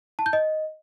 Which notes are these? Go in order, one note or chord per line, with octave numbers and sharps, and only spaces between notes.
A5
G6
D#5